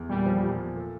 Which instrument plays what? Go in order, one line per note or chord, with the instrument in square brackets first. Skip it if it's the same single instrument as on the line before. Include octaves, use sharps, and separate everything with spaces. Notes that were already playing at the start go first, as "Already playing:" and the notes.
Already playing: [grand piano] E2
[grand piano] A#2 [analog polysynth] G3
[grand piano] F3
A#2
A#2
A4